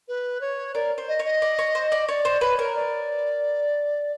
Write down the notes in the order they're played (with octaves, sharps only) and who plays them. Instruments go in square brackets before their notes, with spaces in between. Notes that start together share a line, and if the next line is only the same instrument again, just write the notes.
[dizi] B4
C#5
[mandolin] A#4 [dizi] D5
[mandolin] C5
[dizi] D#5
[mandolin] C#5
[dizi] D#5
[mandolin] D5
C#5
C5
D5
[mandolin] C#5 [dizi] D5
[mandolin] C5
[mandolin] B4 [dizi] C#5
[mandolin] A#4
[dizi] D5